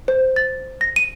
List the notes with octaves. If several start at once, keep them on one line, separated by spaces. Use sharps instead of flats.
C5
A6
A#6
D#7